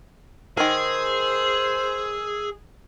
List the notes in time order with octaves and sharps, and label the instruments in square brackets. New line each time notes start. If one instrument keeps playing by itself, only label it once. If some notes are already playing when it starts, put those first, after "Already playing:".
[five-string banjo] D#3 A#4 [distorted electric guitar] G#4 [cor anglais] C5 [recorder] E6